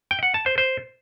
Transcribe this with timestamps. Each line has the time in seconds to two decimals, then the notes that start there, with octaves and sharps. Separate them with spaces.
0.11 G5
0.23 F#5
0.34 A5
0.46 C5
0.58 C5